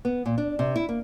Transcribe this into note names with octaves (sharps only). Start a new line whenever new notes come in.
B3
A#2
D4
C3
E4
A#3